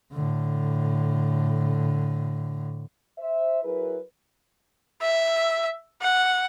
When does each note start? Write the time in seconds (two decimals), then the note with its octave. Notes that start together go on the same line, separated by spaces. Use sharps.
0.13 A2 D3
3.19 C5 E5
3.64 F#3 E4 G#4 A#4 B4
5.02 E5
6.02 F#5